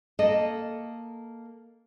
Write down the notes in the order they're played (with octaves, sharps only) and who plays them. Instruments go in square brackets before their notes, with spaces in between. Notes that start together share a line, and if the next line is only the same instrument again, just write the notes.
[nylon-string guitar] A#3 A4 D#5